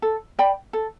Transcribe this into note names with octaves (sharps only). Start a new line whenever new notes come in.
A4
D5 G5 B5
A4